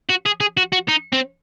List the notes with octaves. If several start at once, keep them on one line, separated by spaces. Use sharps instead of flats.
F#4
G#4
G#4
F#4
F#4
D#4
C4